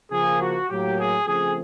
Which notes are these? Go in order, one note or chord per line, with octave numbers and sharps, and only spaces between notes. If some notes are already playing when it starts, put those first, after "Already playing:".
C#3 F3 A#3 G#4
F#4
A2 F#3 A#3 G4
G#4
C#3 F3 A3 C4 G#4